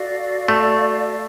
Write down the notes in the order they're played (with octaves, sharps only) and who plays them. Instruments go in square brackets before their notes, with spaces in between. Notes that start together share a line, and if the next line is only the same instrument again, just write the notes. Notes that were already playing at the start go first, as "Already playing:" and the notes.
Already playing: [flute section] F#4 A4 D5 F5
[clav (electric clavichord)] A3